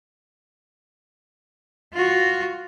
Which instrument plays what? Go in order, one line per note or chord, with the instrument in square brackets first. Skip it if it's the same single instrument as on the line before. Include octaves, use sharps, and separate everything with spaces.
[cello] F4 F#4